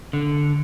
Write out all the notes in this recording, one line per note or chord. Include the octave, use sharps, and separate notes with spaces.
D3